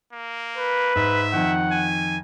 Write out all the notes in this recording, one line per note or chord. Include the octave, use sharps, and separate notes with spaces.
A#3
B4
G#2 E5
F2 D#3 F#5
G#5